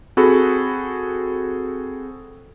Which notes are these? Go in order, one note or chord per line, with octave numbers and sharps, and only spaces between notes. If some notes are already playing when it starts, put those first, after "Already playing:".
C4 F#4 G#4 A4 B5